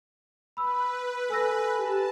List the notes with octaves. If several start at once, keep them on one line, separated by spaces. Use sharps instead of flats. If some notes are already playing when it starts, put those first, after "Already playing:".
B4 B5 E6
A4 G#5 E6 A#6
G4 A5